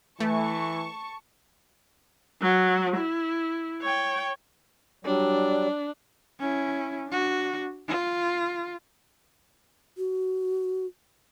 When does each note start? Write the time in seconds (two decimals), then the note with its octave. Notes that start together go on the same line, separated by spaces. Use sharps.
0.20 E3 A3 A5 C#6
2.41 F#3
2.97 E4
3.82 C#5 G5
5.05 F#3 G3 D4
6.40 C#4 E4
7.08 D4 F#4
7.88 F4
9.97 F#4